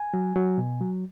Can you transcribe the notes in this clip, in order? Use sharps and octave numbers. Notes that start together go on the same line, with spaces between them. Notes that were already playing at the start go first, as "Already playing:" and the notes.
Already playing: G#5
F#3
F#3
B2
F#3